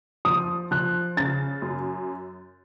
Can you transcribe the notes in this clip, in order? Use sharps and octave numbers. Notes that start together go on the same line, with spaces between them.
F3 D#6
F3 F#6
C#3 A6
F#2